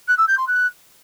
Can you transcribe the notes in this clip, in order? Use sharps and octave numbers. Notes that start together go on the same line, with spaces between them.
F#6
E6
G6
C6
F#6